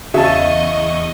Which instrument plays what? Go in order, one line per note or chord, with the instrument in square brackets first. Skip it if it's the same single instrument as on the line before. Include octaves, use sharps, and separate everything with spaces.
[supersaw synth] E2 C#6 [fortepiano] C#3 A5 [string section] D#5 [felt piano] E5